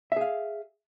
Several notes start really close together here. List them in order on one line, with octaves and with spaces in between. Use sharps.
E5 G#4 F5